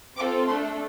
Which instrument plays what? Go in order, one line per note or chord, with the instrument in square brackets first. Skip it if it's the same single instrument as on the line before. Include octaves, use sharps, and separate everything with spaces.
[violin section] C4 F4 A4 D6
A3 D4 A4 C6